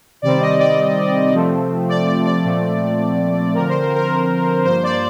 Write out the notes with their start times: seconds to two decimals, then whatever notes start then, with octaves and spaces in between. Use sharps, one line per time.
0.22 C3 D#3 G3 C4 D5
0.40 D#5
0.59 D5
1.32 C3 F3 A3 C4
1.89 D5
2.07 D5
2.25 D5
2.44 A#2 F3 A3 C4
3.54 D3 F3 C4 A#4
3.68 C5
3.82 A#4
3.95 A#4
4.65 G2 F3 A#3 C5
4.83 D5